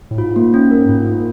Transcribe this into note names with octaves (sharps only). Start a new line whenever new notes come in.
A2
G#2 F4
A#3
C#4
A#4
G#2 F4
A#3